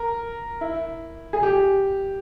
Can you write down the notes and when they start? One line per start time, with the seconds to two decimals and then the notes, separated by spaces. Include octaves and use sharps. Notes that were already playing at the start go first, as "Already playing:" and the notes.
Already playing: A#4
0.61 E4
1.33 G#4
1.43 G4